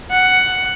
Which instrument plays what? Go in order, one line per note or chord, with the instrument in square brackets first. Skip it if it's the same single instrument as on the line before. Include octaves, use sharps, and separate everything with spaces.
[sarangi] F#5